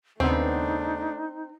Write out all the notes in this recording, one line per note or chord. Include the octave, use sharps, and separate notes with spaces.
D#2 C#3 A3 B3 C4 D4 D#4